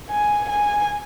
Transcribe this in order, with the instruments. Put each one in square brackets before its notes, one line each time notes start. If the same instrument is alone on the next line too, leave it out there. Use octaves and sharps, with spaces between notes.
[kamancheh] G#5
G#5